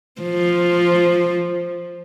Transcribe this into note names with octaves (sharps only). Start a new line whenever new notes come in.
F3